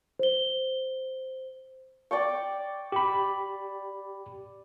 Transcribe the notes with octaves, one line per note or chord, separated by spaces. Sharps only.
C5 G7
D5 G5 C#6
G4 B5